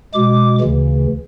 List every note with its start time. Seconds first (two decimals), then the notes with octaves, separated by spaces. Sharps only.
0.14 B2 G#3 D6
0.60 D2 C#3 E3